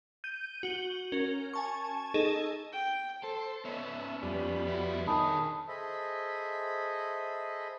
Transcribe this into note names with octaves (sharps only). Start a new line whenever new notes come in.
G6 D#7
F#4 G7
C#4 A#4
G#5 A5 C#6
D#4 G#4 A4 D#5
G5
A4 C5
B3 C#4 D#4 E5
F2 G3 B3
E4 F#4
D3 D#3 G#4 A5 B5 D#6
G#4 A4 C5 D#5 E5 B5